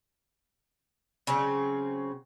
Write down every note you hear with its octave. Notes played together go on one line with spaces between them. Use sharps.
C#3 F#3 C4 C#4